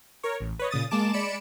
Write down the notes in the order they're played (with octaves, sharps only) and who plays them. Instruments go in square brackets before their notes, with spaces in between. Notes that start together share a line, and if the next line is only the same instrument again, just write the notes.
[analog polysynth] A#4 C#5
A1
B4 C#5 D#5
A#2 C#3 D#6 A6
G#3 A#3 A5 D6 E7
G#3 D5 B5 C#7 D7 E7